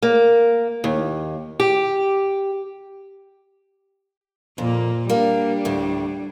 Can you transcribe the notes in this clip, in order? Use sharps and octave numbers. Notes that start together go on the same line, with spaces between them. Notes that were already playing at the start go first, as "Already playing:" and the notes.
A#3
D#2
G4
F2 A#2 A#3
G3 A#3 D4
D2 A2